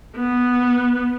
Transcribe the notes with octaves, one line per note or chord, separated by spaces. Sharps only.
B3